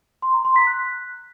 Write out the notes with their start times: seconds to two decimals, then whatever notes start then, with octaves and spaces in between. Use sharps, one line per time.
0.22 C6
0.34 A#5
0.45 C6
0.56 B6
0.67 F#6